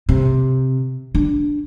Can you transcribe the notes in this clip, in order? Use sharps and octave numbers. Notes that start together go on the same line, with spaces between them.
C3
D4